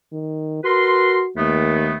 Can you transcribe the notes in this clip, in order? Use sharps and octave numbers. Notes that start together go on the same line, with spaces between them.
D#3
F#4 A#4 B4 C6
D#2 D#3 A3 B3